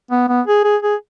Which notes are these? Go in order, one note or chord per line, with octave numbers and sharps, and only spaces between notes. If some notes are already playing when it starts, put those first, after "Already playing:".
B3
B3
G#4
G#4
G#4